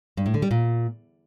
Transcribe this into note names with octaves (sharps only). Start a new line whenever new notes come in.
G2
A2
D3
G3
A#2